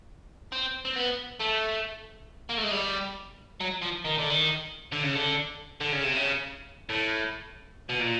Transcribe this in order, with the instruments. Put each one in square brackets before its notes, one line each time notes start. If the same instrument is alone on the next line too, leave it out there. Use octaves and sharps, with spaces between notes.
[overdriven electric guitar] C4
C4
B3
A3
A#3
A3
G#3
G3
F#3
F3
D#3
D3
D#3
D3
C#3
D3
D3
C#3
C3
C#3
A2
B2
A#2